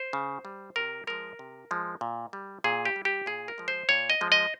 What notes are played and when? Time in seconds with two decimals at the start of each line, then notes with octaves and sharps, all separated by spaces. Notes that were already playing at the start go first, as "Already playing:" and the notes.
Already playing: C5
0.13 C#3
0.45 G3
0.76 C3 A#4
1.07 F3 G#3 A#4
1.39 C3
1.71 F3 G#3
2.01 A#2
2.33 G3
2.64 A#2 G#4
2.85 G4
2.96 G3
3.05 G4
3.26 A#2 G#4
3.48 A#4
3.58 F3 G#3
3.68 C5
3.89 A#2 C#5
4.10 D#5
4.21 F3 G#3
4.32 D#5